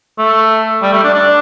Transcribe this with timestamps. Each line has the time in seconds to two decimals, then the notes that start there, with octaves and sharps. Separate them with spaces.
0.18 A3
0.82 G3
0.93 A3
1.03 D4
1.14 D4